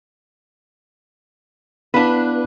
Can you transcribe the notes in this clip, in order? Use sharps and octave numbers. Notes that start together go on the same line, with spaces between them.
B3 D4 E4 B4 F5